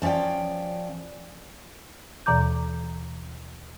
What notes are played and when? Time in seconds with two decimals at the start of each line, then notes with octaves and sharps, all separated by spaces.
0.02 F3 C#4 D5 F5 G5
2.26 D#2 B2 E3 A#5 D6 G6